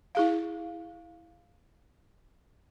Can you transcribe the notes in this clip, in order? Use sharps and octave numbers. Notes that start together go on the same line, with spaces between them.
E4 G#4 F5